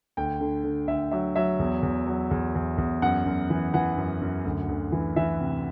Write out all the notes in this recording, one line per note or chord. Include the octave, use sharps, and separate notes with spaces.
D2 G5
D3
D3
D2 E5
F#3 E5
F#3 E5
E2
E2
F#3
E2
E2
E2
F#2 F#5
F#2
E3
E3 F#5
F#2
F#2
D2
D2
E3
E3 E5
C3